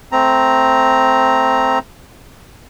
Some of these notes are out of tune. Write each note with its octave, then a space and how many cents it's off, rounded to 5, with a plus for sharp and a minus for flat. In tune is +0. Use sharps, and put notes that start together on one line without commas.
A3 +0 C4 +0 A#5 +0